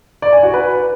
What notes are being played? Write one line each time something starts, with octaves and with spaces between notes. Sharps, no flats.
D5
G#5
F#4
B4